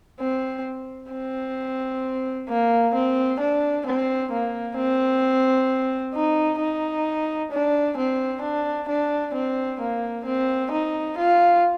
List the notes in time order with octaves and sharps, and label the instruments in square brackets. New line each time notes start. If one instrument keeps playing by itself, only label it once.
[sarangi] C4
C4
A#3
C4
D4
C4
A#3
C4
D#4
D#4
D4
C4
D4
D4
C4
A#3
C4
D#4
F4